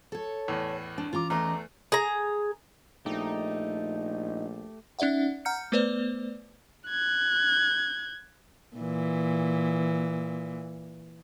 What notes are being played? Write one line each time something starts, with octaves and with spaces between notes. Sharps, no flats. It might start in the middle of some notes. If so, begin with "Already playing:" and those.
A4 C#5
E2 A2
D4
E3 C#4 F4 A#5 D6
E2 A3 D#5 A#5
G#4 A#5
A#1 A3 D#4 G4
C#4 D#4 D5 E5 F#5
F#5 A#5 F6 G6 C#7
A3 B3 B4 C5 D5
F#6 G#6
A#2 E3